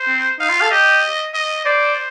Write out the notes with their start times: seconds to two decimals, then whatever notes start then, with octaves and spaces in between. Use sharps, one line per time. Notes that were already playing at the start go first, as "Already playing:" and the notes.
Already playing: C5
0.08 C4
0.40 D#4 F5
0.50 F4
0.61 A4
0.71 G4 D#5
1.34 D#5
1.65 C5 D5